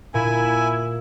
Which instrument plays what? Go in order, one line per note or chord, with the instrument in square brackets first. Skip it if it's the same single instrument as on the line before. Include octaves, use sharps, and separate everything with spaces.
[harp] A#2 [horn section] E4 [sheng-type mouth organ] G#5